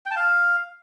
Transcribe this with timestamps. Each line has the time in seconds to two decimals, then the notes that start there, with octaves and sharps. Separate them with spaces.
0.06 G5
0.11 A5
0.16 F5